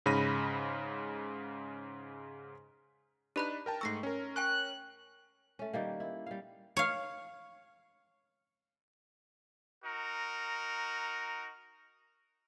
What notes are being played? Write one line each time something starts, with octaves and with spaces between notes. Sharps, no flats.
G#2 C#3 B5 A#6 D#7
D4 D#4 G4 B4 B5 F#6
A#4 G5 A5
G#2 A3 C#6 E6 A#6 C7
C#4 A#4
G5 G#5 C#6 F#6
A3 C#4
D#3 G3 A#3
E4
G3 F5
C#5 F5
D#4 F#4 A#4